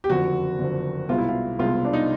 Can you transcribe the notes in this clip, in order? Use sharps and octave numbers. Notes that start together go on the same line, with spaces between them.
G4
F#1 F2 D3 F#4
F#1 F2 D3
C2 B2 G#3 F4
E4
F4
C2 B2 G#3 F4
D4
D#4